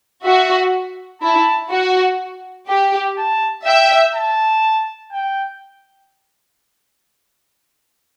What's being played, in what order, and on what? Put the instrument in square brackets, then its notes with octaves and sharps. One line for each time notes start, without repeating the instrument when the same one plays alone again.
[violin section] F#4 [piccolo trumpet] E5
[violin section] E4 [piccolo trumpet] A5
[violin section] F#4
G4
[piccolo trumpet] A5
[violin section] E5 [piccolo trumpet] G5
[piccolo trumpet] A5
G5